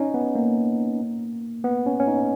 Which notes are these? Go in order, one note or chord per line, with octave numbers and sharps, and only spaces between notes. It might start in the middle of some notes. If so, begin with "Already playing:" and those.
Already playing: C#4 D#4
B3
A#3
B3
C#4
C#4
D#4